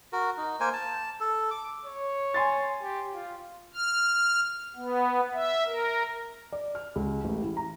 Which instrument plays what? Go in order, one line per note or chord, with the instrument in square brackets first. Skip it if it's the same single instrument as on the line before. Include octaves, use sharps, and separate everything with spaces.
[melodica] F#4 A#4
D#4
A#3 A#4 C5 G#5
A5
A4
D6
[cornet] C#5
[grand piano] G#5 C6 A6
[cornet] G4
F4
[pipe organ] F6
B3
E5
A#4
[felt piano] D5
F6
C#2
A1
E3
A#5